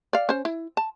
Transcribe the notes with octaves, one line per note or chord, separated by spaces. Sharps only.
D5 F5
C#4 C5
E4
A5